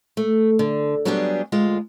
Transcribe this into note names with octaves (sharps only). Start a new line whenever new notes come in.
A3
D3
F#3 G3 B3 D4 G4 G#4
D2 G#3 F4